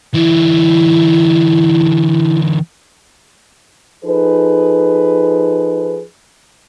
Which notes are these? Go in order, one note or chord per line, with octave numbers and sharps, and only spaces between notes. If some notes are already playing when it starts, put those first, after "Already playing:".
D3 E3 E4
F3 D#4 G#4 A4 B4